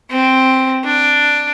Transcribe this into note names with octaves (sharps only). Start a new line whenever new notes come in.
C4
D4